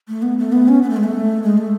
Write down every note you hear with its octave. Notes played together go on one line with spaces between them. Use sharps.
A3
B3
A3
B3
C#4
B3
A3
G#3
A3
G#3
A3